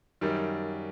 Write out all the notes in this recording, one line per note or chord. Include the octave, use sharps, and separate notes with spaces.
F#2 D#3 G3